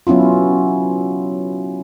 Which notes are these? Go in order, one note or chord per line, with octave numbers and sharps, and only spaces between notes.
F#3 B3 C#4 E4 F4